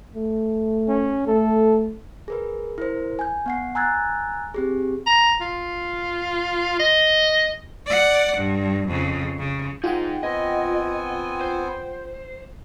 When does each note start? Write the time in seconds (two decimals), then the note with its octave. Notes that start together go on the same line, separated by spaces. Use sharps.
0.16 A3
0.88 C#4
1.27 A3 A4
2.28 G#4 A#4 B4
2.78 E4 A#4 C5
3.19 G#5 G6
3.46 B3 F#5 C7
3.75 G#5 A#5 E6 F#6 G#6 A6
4.54 C4 G4 G#4
5.07 A#5
5.41 F4
6.79 D#5
7.86 D5 F#5
8.37 G2
8.88 F2 C#3
9.39 C#3
9.84 D#4 F4 G#4 F#5 G5
10.23 B3 C4 D#5 G#5
11.41 C5